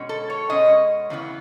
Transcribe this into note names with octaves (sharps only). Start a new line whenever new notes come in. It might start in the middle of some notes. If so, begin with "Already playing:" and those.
Already playing: B2 G#3 C#4
A4
C#5
B2 G#3 C#4 D#5
E2 C#3 E3 B3